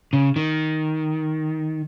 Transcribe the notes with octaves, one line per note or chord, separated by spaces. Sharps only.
C#3
D#3